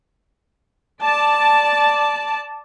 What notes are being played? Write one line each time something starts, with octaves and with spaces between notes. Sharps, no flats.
D5 A5